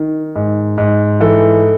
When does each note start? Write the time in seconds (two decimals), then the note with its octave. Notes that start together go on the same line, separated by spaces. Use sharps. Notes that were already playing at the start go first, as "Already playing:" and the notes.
Already playing: D#3
0.36 G#2
0.78 G#2
1.20 E3 A4